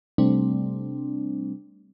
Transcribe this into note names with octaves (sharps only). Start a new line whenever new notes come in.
C3 G3 A3 C4 D4